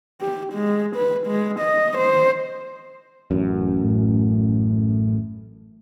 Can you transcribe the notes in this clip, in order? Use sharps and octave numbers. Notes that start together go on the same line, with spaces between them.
G4
G#3
B4
G#3
D#5
C5
A1 F#2
A2